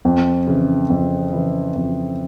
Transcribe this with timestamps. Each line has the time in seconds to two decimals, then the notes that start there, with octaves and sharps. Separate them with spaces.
0.05 F2
0.47 C#3 E3
0.90 F2
1.33 C#3 E3
1.75 F2